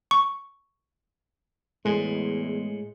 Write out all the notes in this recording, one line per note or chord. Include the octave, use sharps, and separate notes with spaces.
C#6
E2 A2 G#3